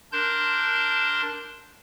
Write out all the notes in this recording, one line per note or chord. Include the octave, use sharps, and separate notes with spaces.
D4 A#4 A5 C6 G6